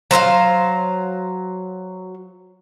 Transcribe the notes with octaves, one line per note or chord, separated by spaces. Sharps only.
F#3 C5 E5 F5